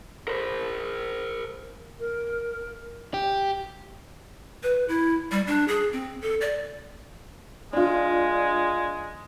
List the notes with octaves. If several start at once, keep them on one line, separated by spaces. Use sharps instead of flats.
A#4 C5
A#4
G4
B4
E4
G3
D4
G#4
C4
A4
D5
G#3 D4 F4